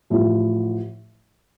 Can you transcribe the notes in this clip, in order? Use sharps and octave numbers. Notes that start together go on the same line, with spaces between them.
A1 A2 F3 A3